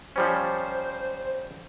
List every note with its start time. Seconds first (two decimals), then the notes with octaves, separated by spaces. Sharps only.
0.16 F3 G3 C#4 C5